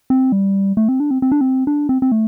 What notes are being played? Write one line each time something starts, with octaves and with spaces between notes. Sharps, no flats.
C4
G3
A3
C4
D4
C4
C4
D4
C4
D4
C4
C4
A3